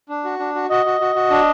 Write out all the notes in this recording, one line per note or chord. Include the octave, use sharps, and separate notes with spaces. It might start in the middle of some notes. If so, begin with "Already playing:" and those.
D4
F#4
D4
F#4
F#4 D#5
F#4
F#4
F#4
D4